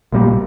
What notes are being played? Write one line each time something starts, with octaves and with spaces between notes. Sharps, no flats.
A#1 A#2 G3 A#3